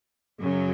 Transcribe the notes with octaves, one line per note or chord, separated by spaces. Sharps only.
F#2 C#3 F#3